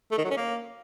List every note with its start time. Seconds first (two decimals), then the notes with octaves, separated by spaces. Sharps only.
0.12 A3
0.18 D#3
0.24 F#3
0.31 C#4
0.37 A#3